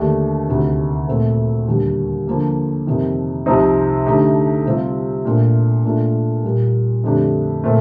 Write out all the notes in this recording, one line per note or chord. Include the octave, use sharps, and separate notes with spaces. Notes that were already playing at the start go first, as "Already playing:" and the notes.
Already playing: D#2 D3 A3 D4 G4
D2 C3 D#3
A#2 A3 C4
D#2 D3 G3
D3 F3 A#3
F2 C3 D#3
C2 C3 F3 C4 D#4
D3 A3 D#4 G4
C3 G3 C4 F4
A#2 A3 D4 F4
A#2 A3 D4 F4
A#2 G3 A#3
F2 D3 A3 D4 G4
A#2 A3 C4